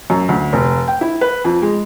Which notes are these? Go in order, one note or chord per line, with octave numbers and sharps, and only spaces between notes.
F#2
D2
F1
G5
E4
B4
F2
G#3